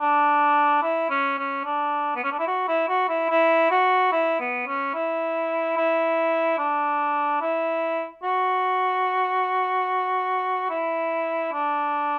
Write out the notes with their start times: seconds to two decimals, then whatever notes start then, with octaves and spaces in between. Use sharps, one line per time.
0.01 D4
0.83 E4
1.10 C#4
1.38 C#4
1.65 D4
2.16 B3
2.24 C#4
2.32 D4
2.39 E4
2.47 F#4
2.68 E4
2.88 F#4
3.09 E4
3.30 E4
3.71 F#4
4.12 E4
4.40 B3
4.67 C#4
4.94 E4
5.77 E4
6.58 D4
7.42 E4
8.23 F#4
10.70 E4
11.52 D4